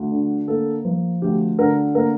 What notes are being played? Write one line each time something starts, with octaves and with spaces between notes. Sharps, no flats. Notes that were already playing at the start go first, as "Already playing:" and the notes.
Already playing: D2
D3
A#3 A4
F3
D2 G4
D3 A#4
A#3 A#4